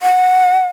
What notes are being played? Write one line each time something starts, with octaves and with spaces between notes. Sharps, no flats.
F#5